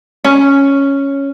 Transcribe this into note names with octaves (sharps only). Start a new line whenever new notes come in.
C#4